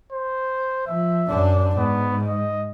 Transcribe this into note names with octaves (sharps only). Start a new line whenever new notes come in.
C5
F3 E5
F#2 D4
G#2 B3
D#5